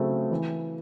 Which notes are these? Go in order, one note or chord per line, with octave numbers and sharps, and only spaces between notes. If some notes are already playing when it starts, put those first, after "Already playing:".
Already playing: C#3 F#3 A3 C4
E3